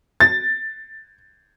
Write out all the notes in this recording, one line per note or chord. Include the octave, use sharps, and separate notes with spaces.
A6